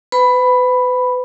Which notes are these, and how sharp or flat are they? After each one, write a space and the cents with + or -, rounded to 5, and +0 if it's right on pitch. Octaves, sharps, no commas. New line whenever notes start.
B4 +35 B5 +0